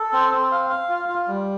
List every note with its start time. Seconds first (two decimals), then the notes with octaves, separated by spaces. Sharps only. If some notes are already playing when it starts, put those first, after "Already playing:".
Already playing: A4
0.13 C4
0.32 C4
0.52 F5
0.70 F5
0.89 F4
1.09 F4
1.28 G3